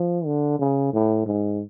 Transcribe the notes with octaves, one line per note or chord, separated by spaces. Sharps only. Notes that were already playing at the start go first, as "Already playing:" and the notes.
Already playing: F3
D3
C#3
A2
G#2